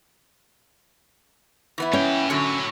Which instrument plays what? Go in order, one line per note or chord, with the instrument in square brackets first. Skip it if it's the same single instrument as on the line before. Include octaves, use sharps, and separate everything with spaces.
[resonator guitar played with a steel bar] E3 B3 E4
[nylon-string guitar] C#4 [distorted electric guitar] C#5 G5
[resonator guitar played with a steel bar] F#2 D3 F#3 [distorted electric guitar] E4 C#5